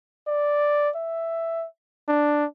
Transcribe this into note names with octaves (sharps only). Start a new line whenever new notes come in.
D5
E5
D4